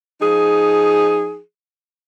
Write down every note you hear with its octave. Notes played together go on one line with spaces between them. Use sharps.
F3 D#4 G#4